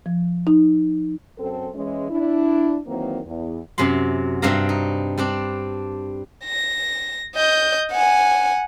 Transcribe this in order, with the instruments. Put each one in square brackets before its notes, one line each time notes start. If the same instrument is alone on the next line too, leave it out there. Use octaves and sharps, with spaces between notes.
[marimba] F3
D#4
[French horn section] F#2 C4 A4
E3 G#3 C#4
D4 E4
D#3 E3 F#3 A#3 C4
E2
[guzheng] F#2 C3 B5 C6
G2 G3 C4 E5 F5 A#5
D#4
G3 C4 D4
[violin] A#6
D#5 G6
F#5 G#5